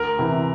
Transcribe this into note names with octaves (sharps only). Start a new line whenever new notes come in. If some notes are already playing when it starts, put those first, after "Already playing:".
Already playing: D2 A#4
C3 E3